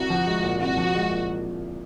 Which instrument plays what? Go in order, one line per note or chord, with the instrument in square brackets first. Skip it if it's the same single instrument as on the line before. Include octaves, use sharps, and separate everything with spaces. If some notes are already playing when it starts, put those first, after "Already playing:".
Already playing: [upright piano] C2 [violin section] F#4
[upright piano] F3
G#3
A#2
[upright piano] C2 [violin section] F#4
[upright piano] F3
G#3
A#2